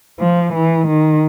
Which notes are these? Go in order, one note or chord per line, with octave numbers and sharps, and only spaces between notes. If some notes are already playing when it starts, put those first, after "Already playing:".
F3
E3
D#3